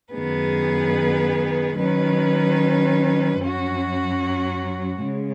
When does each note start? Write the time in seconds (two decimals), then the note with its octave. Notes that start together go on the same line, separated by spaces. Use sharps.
0.14 F#2 D#3 B3 G#4 B4
1.77 D#3 F#3 C#4 B4
3.39 F#2 F#3 C#4 F#4
5.01 C#3 G#3